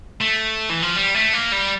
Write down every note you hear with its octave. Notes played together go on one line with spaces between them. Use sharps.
A3
E3
F3
G3
A3
A#3
G3